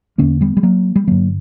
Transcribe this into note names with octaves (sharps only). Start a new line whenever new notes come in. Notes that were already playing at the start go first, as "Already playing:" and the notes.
E2 D3 A#3 C#4
G3 B3
G3
F#3 A#3
G3
G2 D3 F#3 A#3